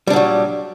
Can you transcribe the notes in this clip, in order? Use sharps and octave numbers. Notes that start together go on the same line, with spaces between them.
A#2 F#3 G3 D4